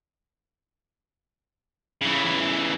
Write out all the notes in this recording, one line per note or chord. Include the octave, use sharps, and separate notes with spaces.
C#3 E3